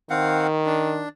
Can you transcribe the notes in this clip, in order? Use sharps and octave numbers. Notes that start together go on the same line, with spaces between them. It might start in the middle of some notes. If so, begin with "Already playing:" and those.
D#3 C4 F5 F#5
D4